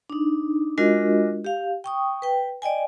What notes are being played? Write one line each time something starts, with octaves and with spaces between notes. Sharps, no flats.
D4 D#4
G#3 D4 F4 F#4 A#4 D#5
G4 F5
G5 C#6 D#6
B4 G5
D5 D#5 G5 G#5